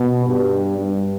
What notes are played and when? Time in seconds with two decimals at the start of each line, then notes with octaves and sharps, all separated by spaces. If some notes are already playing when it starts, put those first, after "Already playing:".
Already playing: B2
0.26 G2
0.78 G2